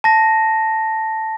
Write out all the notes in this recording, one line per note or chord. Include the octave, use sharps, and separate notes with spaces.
A5 A#6